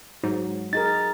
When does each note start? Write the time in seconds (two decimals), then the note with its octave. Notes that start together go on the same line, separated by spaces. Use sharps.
0.23 G#2 F#3
0.73 D#4 G#4 A#4 A6